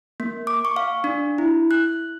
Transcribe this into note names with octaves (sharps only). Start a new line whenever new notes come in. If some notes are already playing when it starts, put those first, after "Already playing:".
A#3
D6
C#6
F5
D4
E4
F#6